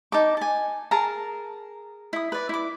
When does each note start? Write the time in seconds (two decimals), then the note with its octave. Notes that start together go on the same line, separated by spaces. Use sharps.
0.12 D#4 A5 D6
0.37 G#5 A5
0.91 G#4 A#4 A5 A#5
2.13 E4 D#6
2.32 B4 D5
2.49 E4 D6